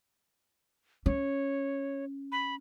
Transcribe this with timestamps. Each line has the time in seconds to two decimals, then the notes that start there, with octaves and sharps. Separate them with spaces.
1.06 C#4 C#5
2.32 B5